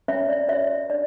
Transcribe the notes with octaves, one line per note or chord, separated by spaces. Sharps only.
C#4 C#5 E5
D5
F#4 C#5 E5
D4 D5